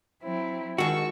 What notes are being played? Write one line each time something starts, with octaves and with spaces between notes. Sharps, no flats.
F#3 C4 E4
D#3 G#3 F#4 A5 C#6 E6